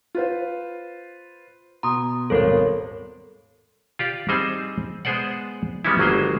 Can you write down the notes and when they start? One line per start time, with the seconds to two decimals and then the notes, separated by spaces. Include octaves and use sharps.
0.15 F4 B4 C5
1.83 B2 A#5 C6 D#6
2.30 D#1 G#1 B2 A4 A#4 C#5
3.99 F4 G4 D5
4.29 G3 C4 D#4 G#4 C5
5.05 G#3 B3 G#4 C5 D5 F#5
5.85 G3 G#3 B3 C#4 D#4 E4
5.99 G1 F#3 G#3 A#3 G#4 C5